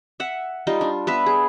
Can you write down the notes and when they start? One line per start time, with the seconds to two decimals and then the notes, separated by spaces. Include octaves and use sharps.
0.20 E5 F#5
0.67 G3 D#4 F4
0.81 D4
1.07 B3 B4 E5
1.26 G#4